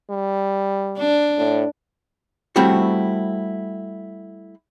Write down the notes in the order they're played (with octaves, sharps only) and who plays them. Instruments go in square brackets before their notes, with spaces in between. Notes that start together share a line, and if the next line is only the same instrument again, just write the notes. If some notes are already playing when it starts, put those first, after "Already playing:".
[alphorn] G3
[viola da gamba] D4
[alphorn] A2
[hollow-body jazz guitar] G3 A3 C4 E4 F#4 C#5